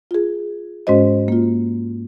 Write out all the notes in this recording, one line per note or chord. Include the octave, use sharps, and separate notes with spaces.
F4 G#4
G#2 G#3 C#4 F#4 C5 D#5
A#3 F4